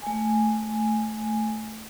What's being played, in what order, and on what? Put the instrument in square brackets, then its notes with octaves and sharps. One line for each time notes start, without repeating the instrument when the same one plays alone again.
[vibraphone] A3 G#5